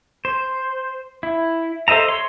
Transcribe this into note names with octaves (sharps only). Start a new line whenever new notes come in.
C5
E4
A4 C5 D#5 E5 A#5
C#5 C6